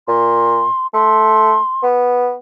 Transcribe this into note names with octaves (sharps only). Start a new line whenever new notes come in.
A#2 C6
A3 C6
B3